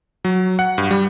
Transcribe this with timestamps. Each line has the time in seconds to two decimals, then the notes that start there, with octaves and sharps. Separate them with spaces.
0.25 F#3
0.59 F#5
0.78 G2
0.91 G3